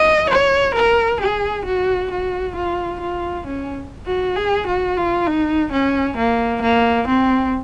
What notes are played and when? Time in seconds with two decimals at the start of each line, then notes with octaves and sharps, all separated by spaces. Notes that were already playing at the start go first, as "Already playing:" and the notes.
Already playing: D#5
0.31 C#5
0.76 A#4
1.21 G#4
1.66 F#4
2.11 F#4
2.56 F4
3.01 F4
3.47 C#4
4.07 F#4
4.36 G#4
4.67 F#4
4.97 F4
5.27 D#4
5.73 C#4
6.18 A#3
6.63 A#3
7.08 C4